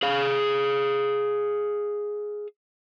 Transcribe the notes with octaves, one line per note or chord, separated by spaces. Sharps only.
G#4 F5